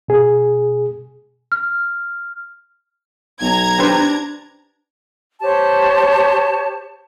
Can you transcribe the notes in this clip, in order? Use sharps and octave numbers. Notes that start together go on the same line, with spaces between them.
B2 G#4
F6
B1 A#5 G#6
D4 G4 B4 C5
G4 C5 C#5 A5